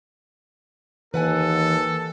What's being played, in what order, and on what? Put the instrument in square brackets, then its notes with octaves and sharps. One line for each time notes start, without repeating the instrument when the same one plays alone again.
[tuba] D#2 [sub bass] E3 [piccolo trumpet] A4 [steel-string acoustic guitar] B4 F#5 G#5